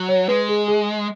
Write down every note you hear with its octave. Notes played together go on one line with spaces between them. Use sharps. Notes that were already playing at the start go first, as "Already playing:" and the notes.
Already playing: F#3
C#5
G#3 B4
G#4
G#4